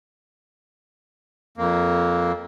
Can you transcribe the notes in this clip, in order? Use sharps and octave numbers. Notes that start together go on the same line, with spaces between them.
F2 A#3